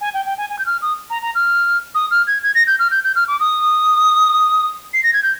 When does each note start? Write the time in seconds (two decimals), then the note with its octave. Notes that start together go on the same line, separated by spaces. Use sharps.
0.01 G#5
0.14 G5
0.26 G5
0.38 G#5
0.50 G#5
0.59 G6
0.66 F6
0.82 D#6
1.10 A#5
1.22 A#5
1.35 F6
1.95 D#6
2.11 F6
2.27 G#6
2.43 G#6
2.55 A#6
2.67 G6
2.79 F6
2.91 G6
3.04 G6
3.16 F6
3.28 D6
3.40 D#6
4.94 C7
5.03 A#6
5.13 G#6
5.23 G6